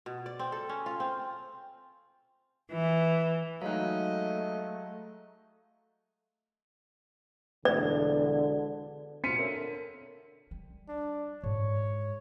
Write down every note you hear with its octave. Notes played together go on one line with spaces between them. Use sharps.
B2
D5
C4
A4
C#4
F4
C4
E3
F#3 G#3 A3 D#4 D#5 F5 F#6
E1 D3 D5
B2 C4 F4 B6 C#7 D#7
D3 A#4 C#5 E5
G3
D4
G#2 C#5